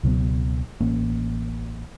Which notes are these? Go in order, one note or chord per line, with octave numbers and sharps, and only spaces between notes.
C#2 B2 F#3 B3
A1 A#3 C#4